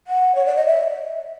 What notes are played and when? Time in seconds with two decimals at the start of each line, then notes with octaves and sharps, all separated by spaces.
0.07 F#5
0.35 C#5
0.46 D5
0.56 D#5
0.67 E5